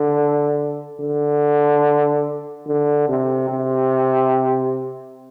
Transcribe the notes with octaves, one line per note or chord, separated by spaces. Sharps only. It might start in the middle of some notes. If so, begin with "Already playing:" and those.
Already playing: D3
D3
D3
C3
C3